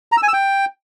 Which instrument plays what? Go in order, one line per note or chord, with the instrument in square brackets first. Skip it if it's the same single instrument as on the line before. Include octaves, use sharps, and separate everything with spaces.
[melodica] A#5
E6
G#5
E6
G5